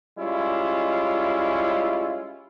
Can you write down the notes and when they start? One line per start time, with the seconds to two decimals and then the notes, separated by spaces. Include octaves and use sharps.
0.18 G3 G#3 C#4 E4 F4